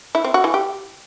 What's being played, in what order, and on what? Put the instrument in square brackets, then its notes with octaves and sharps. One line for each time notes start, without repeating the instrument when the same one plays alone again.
[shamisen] E4
C4
F#4
E3
G4